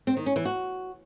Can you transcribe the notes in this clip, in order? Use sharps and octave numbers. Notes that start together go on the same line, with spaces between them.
C4
D#3
C#4
E3
F#4